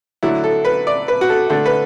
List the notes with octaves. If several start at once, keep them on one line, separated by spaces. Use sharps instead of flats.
D3 F#3 A3 E4
A4
B4
D5
B4
F#4
A4
D3 A3 A4
B4